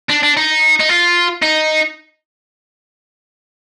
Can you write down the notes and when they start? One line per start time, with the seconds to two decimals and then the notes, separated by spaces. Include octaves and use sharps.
0.10 D4
0.23 D4
0.37 D#4
0.80 D#4
0.90 F4
1.43 D#4